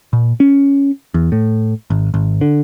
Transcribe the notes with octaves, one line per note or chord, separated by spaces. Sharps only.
A#2
C#4
E2
A2
G#1
G#1
D3